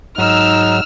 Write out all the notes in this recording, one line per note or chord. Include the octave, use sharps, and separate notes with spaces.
G#2 F#3 D#4 E6 F6